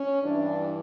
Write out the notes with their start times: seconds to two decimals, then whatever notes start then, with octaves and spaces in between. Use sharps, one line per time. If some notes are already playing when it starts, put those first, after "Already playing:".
Already playing: C#4
0.23 G2 E3 D4